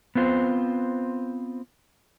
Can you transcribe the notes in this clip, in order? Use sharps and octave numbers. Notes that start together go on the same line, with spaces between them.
B3 C4 F4 C5